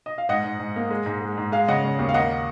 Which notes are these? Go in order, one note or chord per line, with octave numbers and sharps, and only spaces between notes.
D#5
F5
G#2 D#5 F#5
G#2
G#2
A#3
G#3
G#2
G#3
G#2
G#3 F5
C#3 D#5 F#5
C#3
D#2
F5
A#3 D#5 F#5